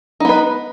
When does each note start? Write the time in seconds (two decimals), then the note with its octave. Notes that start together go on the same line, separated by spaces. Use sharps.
0.20 D#4
0.25 B3
0.29 B4